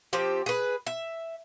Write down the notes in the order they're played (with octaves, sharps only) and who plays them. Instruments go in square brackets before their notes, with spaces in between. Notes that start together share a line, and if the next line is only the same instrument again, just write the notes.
[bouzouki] F3 C4 G4
G#4 B4
E5